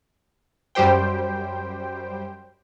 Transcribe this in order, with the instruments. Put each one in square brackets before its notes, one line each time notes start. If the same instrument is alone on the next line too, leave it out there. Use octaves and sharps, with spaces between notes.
[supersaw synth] F#2 G3 G4 C5 G5